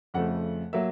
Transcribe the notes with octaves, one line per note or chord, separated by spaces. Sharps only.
F2 C#3 F3 A3 F#5
F#3 A#3 E5